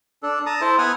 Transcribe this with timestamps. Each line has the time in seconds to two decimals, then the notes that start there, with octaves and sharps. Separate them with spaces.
0.23 D4 A4
0.46 A5 A#5 D#6
0.61 E4 A4 C5
0.78 B3 F#5 G#5 D#6 F6